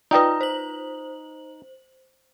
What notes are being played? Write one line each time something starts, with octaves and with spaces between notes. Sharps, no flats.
D#4 F4 B4 D5 D#5 G5 D#6
C5 F#7